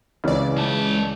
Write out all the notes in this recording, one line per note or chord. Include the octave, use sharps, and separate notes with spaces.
C#2 C#3 E3 D5
G#3 A5